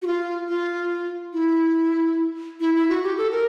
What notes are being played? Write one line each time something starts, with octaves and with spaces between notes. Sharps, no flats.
F#4
F4
F4
E4
E4
E4
F#4
G4
A4
A#4